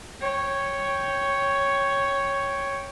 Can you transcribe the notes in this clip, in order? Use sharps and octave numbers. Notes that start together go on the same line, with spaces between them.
C#5 G5